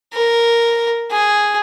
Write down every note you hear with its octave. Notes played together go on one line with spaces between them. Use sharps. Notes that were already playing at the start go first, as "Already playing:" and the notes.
A#4
G#4